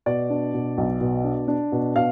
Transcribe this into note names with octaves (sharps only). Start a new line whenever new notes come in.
B2 D5
D4
B2
B1
B2
D4
D4
B2
B2 F5